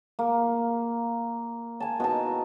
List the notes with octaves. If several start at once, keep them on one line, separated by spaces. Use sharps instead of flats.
A#3
G#5 A5
B2 D#4 A5